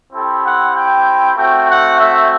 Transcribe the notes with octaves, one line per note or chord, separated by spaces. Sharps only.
C4 E4 G4 A4
F#5
G5
A3 C4 F#4 G5
F#5
E5